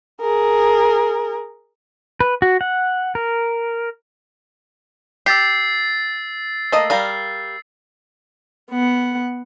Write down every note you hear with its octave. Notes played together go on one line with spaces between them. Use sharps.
G#4 A#4
B4
F#4
F#5
A#4
G4 E6 A6 C7
A3 A#3 D#5
G3 A#4 F5
B3 F#5